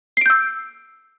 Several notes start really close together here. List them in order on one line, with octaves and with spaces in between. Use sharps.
C7 D7 G6 E6